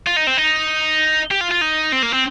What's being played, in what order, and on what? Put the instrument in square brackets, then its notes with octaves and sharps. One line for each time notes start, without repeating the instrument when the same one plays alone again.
[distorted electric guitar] F4
D#4
C4
D#4
G4
F4
F4
D#4
C4
A#3
C4